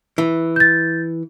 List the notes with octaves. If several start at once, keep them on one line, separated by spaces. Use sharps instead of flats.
E3
G6 A6